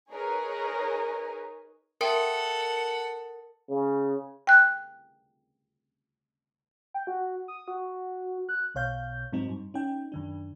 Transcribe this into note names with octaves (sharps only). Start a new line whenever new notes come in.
D#4 G#4 A#4 B4 C#5 G#5
A4 A#4 E5 F#5 G5 C6
C#3
G5 F#6
G5
F#4
D#6
F#4
F#6
B1 B2 C#5 F5 G6
G#2 F#3 C4 D#4
G2
C#4 D#4 G5
F#2 D#3 D4